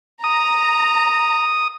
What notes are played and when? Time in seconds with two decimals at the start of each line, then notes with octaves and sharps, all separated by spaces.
0.24 A#5 D#6